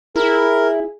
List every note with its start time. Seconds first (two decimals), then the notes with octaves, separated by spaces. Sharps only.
0.16 E4 G#4 A#4